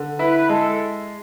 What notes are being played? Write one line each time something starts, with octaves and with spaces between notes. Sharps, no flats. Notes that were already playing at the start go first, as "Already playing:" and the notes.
Already playing: D3
E4 B4
G#3 A4